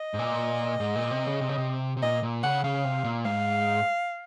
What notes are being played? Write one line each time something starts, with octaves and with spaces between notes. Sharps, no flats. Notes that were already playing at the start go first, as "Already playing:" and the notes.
Already playing: D#5
G#2
A#2
G#2
A#2
C3
C#3
C3
C#3
C3
C3
A#2 D#5
A#2
C#3 F#5
C#3 F5
C3
A#2
G#2 F5